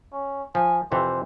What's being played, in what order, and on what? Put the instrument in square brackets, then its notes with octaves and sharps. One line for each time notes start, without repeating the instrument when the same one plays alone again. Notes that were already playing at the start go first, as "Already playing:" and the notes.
[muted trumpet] C#4
[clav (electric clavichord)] F3 [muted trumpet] G#5
[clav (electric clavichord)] F2 C3 E3 [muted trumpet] C5